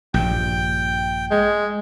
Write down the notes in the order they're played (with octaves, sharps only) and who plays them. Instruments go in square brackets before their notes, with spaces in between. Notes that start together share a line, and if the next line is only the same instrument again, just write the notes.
[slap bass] A#1 G2 [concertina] G5
[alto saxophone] G#3